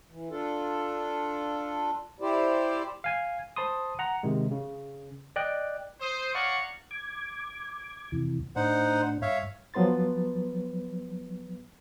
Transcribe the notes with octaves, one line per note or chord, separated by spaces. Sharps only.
E3
D4 F4 A4
E4 G4 C5 D5
F5 G#5 G#6
C5 A5 B5 C6 D#6
F#5 A#5
C3 D#3 G#3
C#3
D5 D#5 G5 F#6
C5 D#6
C#5 D5 F5 F#5 A#5 C#6
D6 G#6
F2 C3 E3
A2 D4 D#4 C5 F#5
G2 C#5 E5 F5
F3 F#3 B3 B4 C6 A6